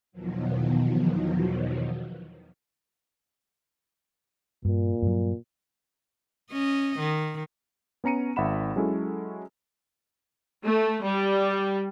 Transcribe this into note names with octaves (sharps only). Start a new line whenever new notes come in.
E2 B2 D#3 F3 F#3
G2 A#2
G2 F#3
C#4 D#5
D#3
B3 C#4 A#5 C#7 D#7
G#1 E5 F#5 B5 E7
F#3 G#3 C#4 E4 A4
A3
G3